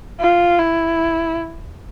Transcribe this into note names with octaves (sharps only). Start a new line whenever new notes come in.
F4
E4